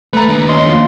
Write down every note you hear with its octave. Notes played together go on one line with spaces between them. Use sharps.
A3 B4 A#5
D#2 D4
C#4 D#5 C6
F3 F4